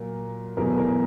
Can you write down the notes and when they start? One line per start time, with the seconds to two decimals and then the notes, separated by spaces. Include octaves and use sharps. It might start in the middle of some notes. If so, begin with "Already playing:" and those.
Already playing: A#2 F#3 A#4
0.57 E2 B2 F#3 A3 G#4 A#4
0.77 G#4 A#4